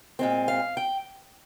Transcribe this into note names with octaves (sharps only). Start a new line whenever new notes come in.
A#2 G#3 C4
F5
G5